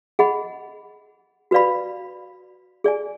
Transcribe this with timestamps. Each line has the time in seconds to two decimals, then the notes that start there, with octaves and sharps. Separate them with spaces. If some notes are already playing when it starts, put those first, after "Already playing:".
0.19 G#4 D#5 F#5 B5
1.51 F#4 B4 D5 F5 B5
2.84 G#4 D5 G#5